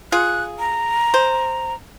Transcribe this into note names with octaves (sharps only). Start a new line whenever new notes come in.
F4 G#4 F#6
A#5
C5